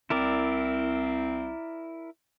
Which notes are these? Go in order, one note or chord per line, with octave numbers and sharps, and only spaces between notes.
C2 C4 E4 A#4 D5